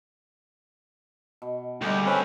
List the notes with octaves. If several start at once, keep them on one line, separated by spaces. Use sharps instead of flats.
B2
D2 D3 G3 G#3 A#3 G5
C4 C#4 B4